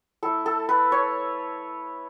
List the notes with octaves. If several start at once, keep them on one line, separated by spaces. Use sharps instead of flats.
A3 E4 A4
A4
B4
C#5